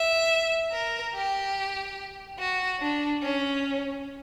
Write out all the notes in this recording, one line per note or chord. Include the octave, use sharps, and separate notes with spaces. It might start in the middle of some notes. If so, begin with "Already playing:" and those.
Already playing: E5
A#4
G4
F#4
D4
C#4